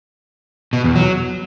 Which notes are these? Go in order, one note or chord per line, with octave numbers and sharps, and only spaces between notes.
B2
E2
F#3